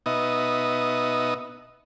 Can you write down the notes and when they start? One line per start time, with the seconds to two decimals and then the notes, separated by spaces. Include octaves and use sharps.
0.06 B2 B3 D#4 D#5 E5 D#6